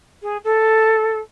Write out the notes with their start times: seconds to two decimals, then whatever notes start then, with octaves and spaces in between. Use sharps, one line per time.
0.22 G#4
0.44 A4